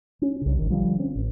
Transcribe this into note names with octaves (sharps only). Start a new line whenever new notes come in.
C#4
C2 C#3
G#1 D#3
D3 F3 G3
C4 C#4
A1